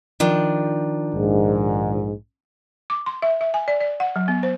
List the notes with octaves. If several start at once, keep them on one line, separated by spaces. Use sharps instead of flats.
D#3 F3 D4
A#1 G#2
D6
C6
E5
E5
G#5
D5
D5
F#5
F#3
B3
C5